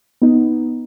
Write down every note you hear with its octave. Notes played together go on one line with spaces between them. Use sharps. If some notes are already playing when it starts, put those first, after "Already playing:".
B3 D#4